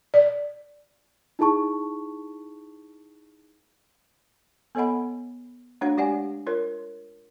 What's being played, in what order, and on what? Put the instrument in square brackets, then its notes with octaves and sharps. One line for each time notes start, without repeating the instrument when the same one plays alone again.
[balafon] D5
[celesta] D#4 E4 G#4 A5 C#6
[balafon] B3 A4 C#5 D#5 F#5 B5
A3 D4 F#4 C#5 F#5
G#3 G4 D5 F5 F#5 G#5
F4 A#4 C#5